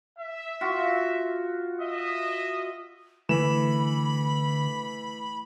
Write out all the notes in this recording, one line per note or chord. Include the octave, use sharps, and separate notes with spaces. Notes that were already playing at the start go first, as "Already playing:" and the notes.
E5
F4 F#4
D#5 E5
D3 E3 A3 B5 E7